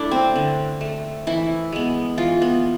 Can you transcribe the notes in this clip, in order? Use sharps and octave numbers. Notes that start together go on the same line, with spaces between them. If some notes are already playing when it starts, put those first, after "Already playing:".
Already playing: A3 D4 E4
C4
D3
A3
E3 E4
G#3 B3
E3 F4
B3